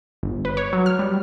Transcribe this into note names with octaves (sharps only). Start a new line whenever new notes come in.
G1
B4
C#5
F#3
F6
G3